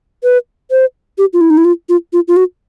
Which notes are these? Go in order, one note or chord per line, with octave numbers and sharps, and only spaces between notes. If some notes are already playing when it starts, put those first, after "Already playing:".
B4
C5
G4
F4
E4
D#4
E4
F4
F4
F4
F4
F#4